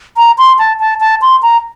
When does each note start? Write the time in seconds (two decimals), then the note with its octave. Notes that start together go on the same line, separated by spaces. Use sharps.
0.17 A#5
0.38 C6
0.59 A5
0.80 A5
1.01 A5
1.22 C6
1.43 A#5